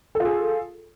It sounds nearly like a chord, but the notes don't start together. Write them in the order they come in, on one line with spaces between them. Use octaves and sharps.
A4 F4 G#4